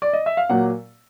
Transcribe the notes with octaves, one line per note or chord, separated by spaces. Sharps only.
D5
D#5
E5
F5
A#2 F#3 A#3 F#5